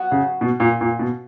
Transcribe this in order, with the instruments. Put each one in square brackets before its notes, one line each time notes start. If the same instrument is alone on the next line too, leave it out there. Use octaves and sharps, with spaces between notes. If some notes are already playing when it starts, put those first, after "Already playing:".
Already playing: [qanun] F#3 B3 F#4
[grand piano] C#3
B2
A#2
A#2
B2